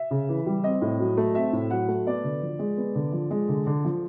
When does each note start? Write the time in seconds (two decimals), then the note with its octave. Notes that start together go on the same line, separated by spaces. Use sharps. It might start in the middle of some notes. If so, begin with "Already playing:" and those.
Already playing: E5
0.11 C#3
0.29 E3
0.46 G3
0.63 C4 D#5
0.81 A2
1.00 F#3
1.17 A3
1.35 C4 E5
1.53 A2
1.70 F#3 F#5
1.88 A3
2.07 B3 D5
2.24 D3
2.42 F3
2.59 G#3
2.77 B3
2.95 D3
3.12 F3
3.31 G#3
3.49 D3
3.67 D3
3.85 F3